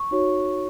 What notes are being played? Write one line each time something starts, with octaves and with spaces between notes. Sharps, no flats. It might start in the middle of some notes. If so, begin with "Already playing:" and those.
Already playing: C#6
D#4 F#4 C#5